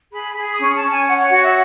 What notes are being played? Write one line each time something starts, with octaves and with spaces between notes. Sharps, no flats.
G#4 B5
G#4 B5
D#6
C#4 C#6
A5
C#4
G#5
C#5 F#5
F#5
F#4 F#5
E5